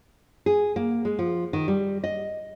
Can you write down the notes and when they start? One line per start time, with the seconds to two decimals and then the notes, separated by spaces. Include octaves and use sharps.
0.46 G#4
0.76 A#3
1.05 G#3
1.19 F3
1.53 D#3
1.68 G3
2.04 D#5